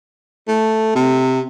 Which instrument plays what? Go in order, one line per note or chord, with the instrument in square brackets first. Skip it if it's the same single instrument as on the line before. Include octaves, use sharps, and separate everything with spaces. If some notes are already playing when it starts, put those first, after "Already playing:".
[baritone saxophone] A3
C3